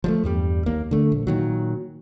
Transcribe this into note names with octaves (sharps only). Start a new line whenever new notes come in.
F3 F#3 A3
E2 G2 G3
D#2 A#3
D3 A3
A#1
A#2 D#3 F#3